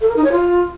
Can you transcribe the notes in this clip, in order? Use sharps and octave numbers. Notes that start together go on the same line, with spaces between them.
A4
A#4
D#4
C#5
F4